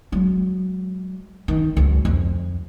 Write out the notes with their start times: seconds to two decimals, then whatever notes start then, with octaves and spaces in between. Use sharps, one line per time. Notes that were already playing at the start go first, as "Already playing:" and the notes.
0.12 F#3 G#3
1.48 D#3
1.76 C#2 F#2
2.05 F2